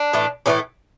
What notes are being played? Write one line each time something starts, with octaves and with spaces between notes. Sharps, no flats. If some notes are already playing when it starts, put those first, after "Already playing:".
Already playing: D4
A2 E3 A3
A2 E3 A3 C#4